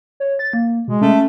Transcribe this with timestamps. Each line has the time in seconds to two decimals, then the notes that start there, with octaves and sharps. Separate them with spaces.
0.20 C#5
0.39 A6
0.53 A#3
0.88 B2 G#3
1.01 A3 C#4